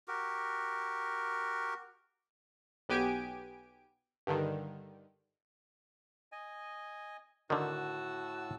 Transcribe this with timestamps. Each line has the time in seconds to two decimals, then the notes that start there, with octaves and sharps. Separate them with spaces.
0.08 F#4 G4 A#4
2.89 B1 B3 G4 G#5 D7
4.27 G2 D3 D#3
6.32 D#5 G#5
7.50 A2 D3 D#3 F#4 A5 E6